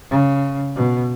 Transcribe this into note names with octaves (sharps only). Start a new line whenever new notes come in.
C#3
B2